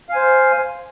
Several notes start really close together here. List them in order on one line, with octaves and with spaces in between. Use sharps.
F5 G#5 C5